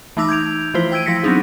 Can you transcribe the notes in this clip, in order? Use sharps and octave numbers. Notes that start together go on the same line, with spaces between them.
E3 A3 D#4 D6 E6 A#6
G6 G#6 D7 F7
E3 F3 A3 E4 F4 C5
G5 E6 G#6 D7 D#7
F3 E4 E6 A#6 B6 C#7
F#3 B3 C4 D4 D#4 G#4